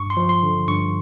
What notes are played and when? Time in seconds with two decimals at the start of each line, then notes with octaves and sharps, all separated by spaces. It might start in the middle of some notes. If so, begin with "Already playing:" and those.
Already playing: G2 C#6
0.10 C6
0.17 F3
0.29 C6
0.43 D3
0.68 G2 C#6